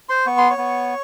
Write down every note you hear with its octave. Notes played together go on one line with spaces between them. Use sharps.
C5 C6
B3 C#6
C6
C#5 C#6
B3